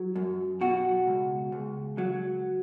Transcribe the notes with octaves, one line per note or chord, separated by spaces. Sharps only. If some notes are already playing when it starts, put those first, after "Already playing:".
Already playing: F#3
F#2
B2 F#4
C#2
C#2
F#3